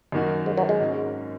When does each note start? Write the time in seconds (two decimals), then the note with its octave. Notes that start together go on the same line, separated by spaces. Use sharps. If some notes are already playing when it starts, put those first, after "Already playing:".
0.12 F#2 D#3 A#3 D#4 F#4
0.46 G#2
0.57 F#3
0.69 G#3
0.80 G#1 G#2 F#3 A#3 C#4